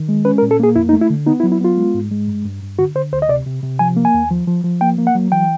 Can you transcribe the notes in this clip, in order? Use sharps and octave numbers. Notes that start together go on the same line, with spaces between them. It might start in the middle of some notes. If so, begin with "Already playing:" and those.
Already playing: D#3
G#3
C#4 B4
A#4
A#2
A4
A#3 G#4
F2 E4
D#4
A3
E4
D3
B3 D#4
E4
F#3
E4
B3 F4
G#3
G#2
G#3
G2
G2
G2
D3 F#4
D3 C5
D2 C5
D#5
C3 D5
C3
C3
F3 G#5
A#3
G#5
D#2
F3
F3
F3
A#3 G5
A#3
F#5
F#3
E3 G5